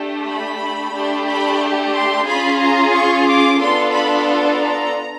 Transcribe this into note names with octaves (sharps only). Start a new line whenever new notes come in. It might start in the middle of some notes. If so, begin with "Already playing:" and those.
Already playing: A3 D4 G4
B5
A3 D4 G4
B5
C6
C#4 F4 G#4 B5
A#5
C#6
D6
B3 D4 F4 A4 C6
B5
A#5